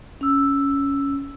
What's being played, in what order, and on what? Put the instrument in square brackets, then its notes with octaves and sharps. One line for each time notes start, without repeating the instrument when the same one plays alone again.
[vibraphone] C#4 E6